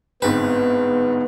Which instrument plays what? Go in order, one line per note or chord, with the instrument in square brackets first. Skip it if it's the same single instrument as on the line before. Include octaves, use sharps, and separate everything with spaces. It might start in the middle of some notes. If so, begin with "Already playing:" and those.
[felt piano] G1 G#2 C4 [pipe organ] B3 [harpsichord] B4